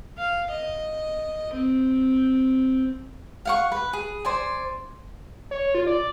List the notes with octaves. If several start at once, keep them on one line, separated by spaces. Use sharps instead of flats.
F5
D#5
C4
F5 F#5 C#6
B4
G#4
C5 D5 G#5
C#5
F4
D5